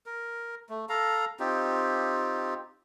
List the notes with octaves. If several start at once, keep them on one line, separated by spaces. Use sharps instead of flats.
A#4
A3
A4 F5 A#5
C4 D#4 F4 G4